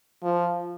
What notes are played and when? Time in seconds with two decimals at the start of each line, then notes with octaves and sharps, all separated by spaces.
0.24 F3